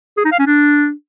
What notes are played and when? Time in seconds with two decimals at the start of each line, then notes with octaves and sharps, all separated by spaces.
0.17 G#4
0.25 D#4
0.32 F5
0.39 C#4
0.47 D4